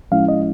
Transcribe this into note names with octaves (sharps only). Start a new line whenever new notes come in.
A2 F3 G#3 C#4 E4 F5
D#5